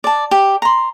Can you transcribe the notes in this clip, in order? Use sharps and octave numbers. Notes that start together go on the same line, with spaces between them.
D5 A5
G4
A#5 C6